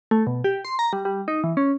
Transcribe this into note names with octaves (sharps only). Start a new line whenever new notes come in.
A3
B2
G4
C6
A#5
G3
G3
D#4
E3
C#4